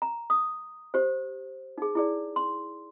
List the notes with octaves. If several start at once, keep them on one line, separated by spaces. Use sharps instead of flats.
A#5
D#6
G4 C5
D#4 G#4
E4 G#4 D5
C6